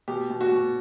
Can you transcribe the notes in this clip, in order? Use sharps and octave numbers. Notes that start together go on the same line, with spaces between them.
B2 G4
B2
F#4
B2